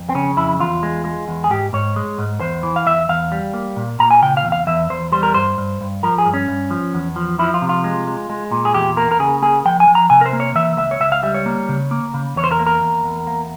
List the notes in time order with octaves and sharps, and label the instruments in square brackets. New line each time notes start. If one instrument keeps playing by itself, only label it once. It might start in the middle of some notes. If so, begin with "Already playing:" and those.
Already playing: [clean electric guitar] F2
C4
C#3 C#4
F2 E4
E2 F4
G#3
G#3
E2
G#4
G#2 G4
G#2 C#5
G#3
G#2
E2 C5
E3
F5
E2 E5
E2 F5
G3
A#3
A#2
A#2 A#5
G#5
C#3 G5
F5
E2
F5
E2 E5
E2 C5
G3 C5
A#4
G2 C5
G2
G2
F3 A#4
G#4
G2
C#4
G2
F3
E2
F3
F3 E4
F4
C3
F4
G#3
G#3
G#3
A#2
G#4
E2 G4
A#3 A#4
A#4
C#3 G#4
A#3 G#4
F3 G5
G#5
F3
A#5
C3 G#5
A#4
C5
A#3
C#5
E3 E5
C#2 E5
C#5
C#2 E5
F5
G3 E5
C#5
A#3
C#3
A#3
C#3
E2 C#5
C5
A#4
A#3
A#4
E2
E2
A#3